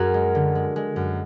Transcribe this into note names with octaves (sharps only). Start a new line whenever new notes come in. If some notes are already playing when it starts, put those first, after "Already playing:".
Already playing: F#2 F#4 G#4 A#4
G#3
D3
G#3
G#3
F#2